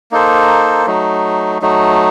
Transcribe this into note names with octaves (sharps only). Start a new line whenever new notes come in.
A#3 D#4 A4 C5
F#3 A3 D#4
F#3 A3 D#4